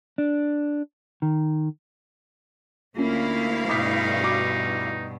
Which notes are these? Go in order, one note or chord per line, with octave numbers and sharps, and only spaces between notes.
D4
D#3
D2 A#3 C#4 E4 F4 F5
G2 B2 D#4 D6 D#6 B6
F#4 D6